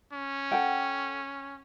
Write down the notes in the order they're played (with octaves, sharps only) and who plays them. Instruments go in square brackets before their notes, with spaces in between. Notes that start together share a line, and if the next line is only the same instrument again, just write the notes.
[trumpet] C#4
[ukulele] A4 F#5 G5